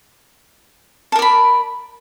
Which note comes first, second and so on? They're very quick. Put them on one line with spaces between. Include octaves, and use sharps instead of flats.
A5 A#4 D5 B5